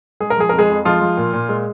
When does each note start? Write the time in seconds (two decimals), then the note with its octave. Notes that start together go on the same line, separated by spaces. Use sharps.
0.20 G#3 G#4
0.30 A#4
0.37 F3 G#4
0.49 F2 A#4
0.58 G#3 G#4
0.70 F2
0.85 F3 G#3 F4
1.01 F3
1.17 A#2
1.34 A#2
1.49 G#3